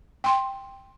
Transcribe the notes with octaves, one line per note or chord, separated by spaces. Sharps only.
G5 C6